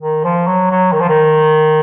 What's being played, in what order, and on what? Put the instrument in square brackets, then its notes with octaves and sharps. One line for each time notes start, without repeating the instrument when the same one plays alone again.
[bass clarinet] D#3
F3
F#3
F#3
D#3
F3
D#3